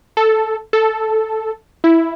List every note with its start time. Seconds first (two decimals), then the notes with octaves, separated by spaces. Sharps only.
0.17 A4
0.73 A4
1.84 E4